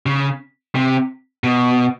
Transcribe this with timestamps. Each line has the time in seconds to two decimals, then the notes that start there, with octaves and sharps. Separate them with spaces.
0.06 C#3
0.75 C3
1.44 B2